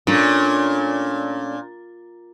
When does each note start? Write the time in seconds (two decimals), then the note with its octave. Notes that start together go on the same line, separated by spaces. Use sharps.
0.07 A#2 A3 C#4 D4